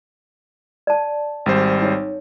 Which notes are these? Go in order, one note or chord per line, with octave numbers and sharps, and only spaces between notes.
D5 A5
G#1 G3 C5
D#4 C#5